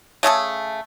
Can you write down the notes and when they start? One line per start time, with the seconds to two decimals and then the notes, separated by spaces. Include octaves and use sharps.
0.23 C#3 A3 G#4 A4